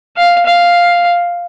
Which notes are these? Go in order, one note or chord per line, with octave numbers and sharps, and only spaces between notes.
F5
F5